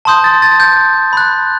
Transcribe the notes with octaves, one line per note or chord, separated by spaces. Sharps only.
A5 C6 D#6 G6
A6
A6
G6
B5 F#6